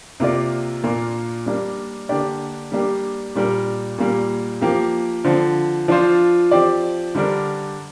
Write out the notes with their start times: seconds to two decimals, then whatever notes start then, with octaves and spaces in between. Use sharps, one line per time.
0.20 C3 A#3 F4 A#4 D5
0.83 A#2 A#3 D4 F4
1.46 G3 A#3 D4
2.09 D3 A#3 D4 G4 D5
2.72 G3 A#3 D4 G4
3.35 A#2 G3 D4 A#4
3.98 A#2 G3 A#3
4.61 F3 A#3 G4
5.24 D3 F3 C4
5.88 F3 D4 F4 C5
6.51 F3 C4 G4 D5
7.15 D3 G3 D4 A#4